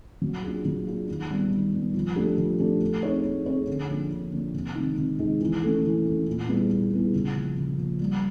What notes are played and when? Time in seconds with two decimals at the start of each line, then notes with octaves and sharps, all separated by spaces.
0.22 F#3
0.43 A#3 D4 F4 G#4
0.65 F#3
0.87 A#3 D4 F4 G#4
1.08 D#3
1.30 G3 B3
1.51 D#3
1.73 G3 B3
1.94 F3
2.16 A3 D4 G4
2.38 F3
2.59 A3 D4 G4
2.81 A3
3.03 C4 D#4 G#4 C#5
3.25 A3
3.46 C4 D#4 G#4 C#5
3.67 D3
3.89 F3 A#3 D4
4.11 D3
4.33 F3 A#3 D4
4.54 C3
4.75 D#3 G#3 C4 D#4
4.97 C3
5.19 D#3 G#3 C4 D#4
5.41 E3
5.63 A3 C#4
5.84 E3
6.05 A3 C#4
6.27 A#2
6.49 G3 B3 E4 G#4
6.70 A#2
6.92 G3 B3 E4 G#4
7.13 C#3
7.35 F3 A#3
7.57 C#3
7.78 F3 A#3
8.00 G3